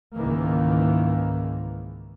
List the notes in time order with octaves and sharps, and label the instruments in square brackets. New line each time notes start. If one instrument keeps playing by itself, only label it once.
[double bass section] C#2 G#2 D#3 E3 A#3